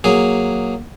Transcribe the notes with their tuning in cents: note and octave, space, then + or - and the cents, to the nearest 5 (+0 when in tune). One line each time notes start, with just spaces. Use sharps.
F#3 +0 A#3 +0 G#4 +0